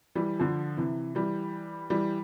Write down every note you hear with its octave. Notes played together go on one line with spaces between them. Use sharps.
E3 G3
D3 F3
C3 E3
E3 G3
E3 G3